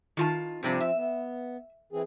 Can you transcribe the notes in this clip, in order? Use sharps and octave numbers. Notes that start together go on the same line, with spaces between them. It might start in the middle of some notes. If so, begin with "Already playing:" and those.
D#3 F4 A5
G2 C3 F3 C4 D4
E5
B3
E3 C4 G#4